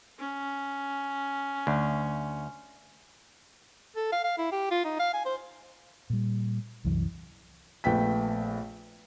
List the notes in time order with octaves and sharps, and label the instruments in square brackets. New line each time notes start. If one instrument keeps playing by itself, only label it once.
[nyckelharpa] C#4
[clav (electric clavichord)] D2
[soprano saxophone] A4
F5
F5
E4
G4
F4
D#4
F5
G#5
C5
[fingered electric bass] A#2 G3
C2 F#2 E3
[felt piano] A#1 A3 B3 G5 B6